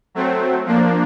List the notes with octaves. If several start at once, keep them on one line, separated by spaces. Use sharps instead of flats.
F#3 A3 C4
F3 A#3 D4